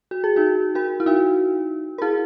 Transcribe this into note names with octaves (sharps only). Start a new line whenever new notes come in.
F#4
G#4
D#4 F#4
F#4 A#4
E4
D#4 F#4
A#4
E4 G#4